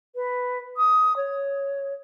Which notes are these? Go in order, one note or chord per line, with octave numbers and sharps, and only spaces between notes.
B4
D#6
C#5